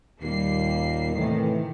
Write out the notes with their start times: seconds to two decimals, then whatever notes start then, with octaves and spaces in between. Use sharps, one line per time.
0.22 D#2 A#2 G3 A#3 C7
1.15 A2 C3 D#3 E3